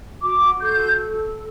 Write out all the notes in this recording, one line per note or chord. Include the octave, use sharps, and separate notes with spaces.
F#4 D6
A4 G6